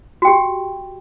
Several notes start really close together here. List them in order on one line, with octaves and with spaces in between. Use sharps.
F#4 G5 G4